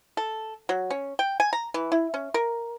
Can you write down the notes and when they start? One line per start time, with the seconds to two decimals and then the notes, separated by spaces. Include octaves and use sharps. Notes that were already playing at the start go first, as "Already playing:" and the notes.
0.17 A4
0.69 F#3
0.90 C#4
1.19 G5
1.40 G#5
1.53 A#5
1.74 E3
1.92 E4
2.14 C#4
2.34 A#4